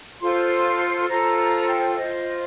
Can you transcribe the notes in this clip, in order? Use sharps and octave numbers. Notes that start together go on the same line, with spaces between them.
F4 A4 C5 C6
F4 A4 C5 A#5
A#5
G5
F4 C5 D#5